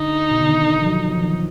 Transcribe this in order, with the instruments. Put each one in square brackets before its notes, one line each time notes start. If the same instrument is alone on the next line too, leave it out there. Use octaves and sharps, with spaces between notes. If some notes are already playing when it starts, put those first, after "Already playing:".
Already playing: [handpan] D3 [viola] D#4
[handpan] B2
D3
D#3
F3
F#3
F3
D#3